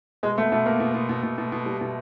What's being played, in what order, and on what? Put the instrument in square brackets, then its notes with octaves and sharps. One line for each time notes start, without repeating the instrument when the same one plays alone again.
[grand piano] B2 [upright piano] G#3
[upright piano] A3 [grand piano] B3
[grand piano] B2 [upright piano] A3
[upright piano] A#3 [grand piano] B3
[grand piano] B2
B2
B2
B2
B2
B2
G3
B2